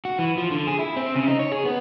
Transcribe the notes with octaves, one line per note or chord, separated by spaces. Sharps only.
F#4
E3
F3
D3
G#4
E4
C4
C#3
D#4
C#5
G#4
B3